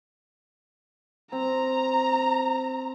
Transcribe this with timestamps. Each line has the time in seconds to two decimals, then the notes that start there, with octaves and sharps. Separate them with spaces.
1.32 C4 A#5